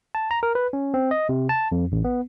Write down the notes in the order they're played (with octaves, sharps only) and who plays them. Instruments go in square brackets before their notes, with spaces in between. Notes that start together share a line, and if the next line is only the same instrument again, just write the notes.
[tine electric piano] A5
A#5
A#4
B4
C#4
C4
D#5
C3
A5
F2
A1
B3